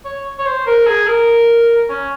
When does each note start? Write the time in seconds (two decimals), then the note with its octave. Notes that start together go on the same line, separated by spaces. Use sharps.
0.05 C#5
0.38 C#5
0.46 C5
0.67 A#4
0.87 G#4
1.07 A#4
1.89 C#4